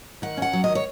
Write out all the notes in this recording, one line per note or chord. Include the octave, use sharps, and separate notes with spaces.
D#3 F#5
C#4 F#5
F#3
D#3 D#5
C#5